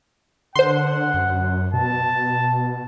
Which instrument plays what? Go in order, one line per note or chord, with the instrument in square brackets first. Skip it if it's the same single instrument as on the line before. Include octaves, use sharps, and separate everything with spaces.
[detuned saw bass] D3 [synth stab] C5 C6 [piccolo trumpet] F#5
[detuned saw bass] F#2
[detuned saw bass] B2 [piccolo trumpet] A5